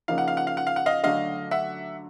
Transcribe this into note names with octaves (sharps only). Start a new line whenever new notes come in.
C#3 F3 A#3 D#4 F5
F#5
F5
F#5
F5
F#5
F5
F#5
D#5 F5
D3 F#3 A3 D4 F#4 D#5 F5
E5 F#5